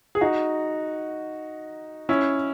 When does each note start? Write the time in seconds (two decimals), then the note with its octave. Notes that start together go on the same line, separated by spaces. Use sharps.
0.15 G#4
0.21 D#4 F#4
2.09 C#4 E4